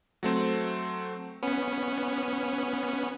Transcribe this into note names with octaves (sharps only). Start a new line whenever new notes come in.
F#3 A3 C4
B3 C#4